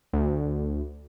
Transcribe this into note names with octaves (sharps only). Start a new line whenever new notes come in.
D2